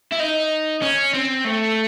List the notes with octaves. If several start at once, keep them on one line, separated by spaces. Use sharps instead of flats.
E4
D#4
C#4
C4
A3